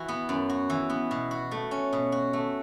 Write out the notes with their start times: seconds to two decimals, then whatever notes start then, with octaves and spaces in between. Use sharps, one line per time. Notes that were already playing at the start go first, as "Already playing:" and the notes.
Already playing: E3 F#4
0.08 B3
0.29 F#2
0.49 F#4
0.70 E3
0.90 B3
1.11 B2
1.31 F#4
1.51 A3
1.71 C#4
1.93 B2
2.12 F#4
2.33 A3